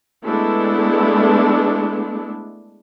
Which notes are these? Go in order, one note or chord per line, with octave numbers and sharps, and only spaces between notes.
G#3 A3 B3 D4 E4 A4